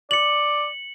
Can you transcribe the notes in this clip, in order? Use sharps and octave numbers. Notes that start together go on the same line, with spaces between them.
D5 C#7 F#7